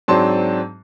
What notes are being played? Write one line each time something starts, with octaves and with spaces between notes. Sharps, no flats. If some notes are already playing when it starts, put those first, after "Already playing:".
G#2 F#3 C4 D4 A5 C6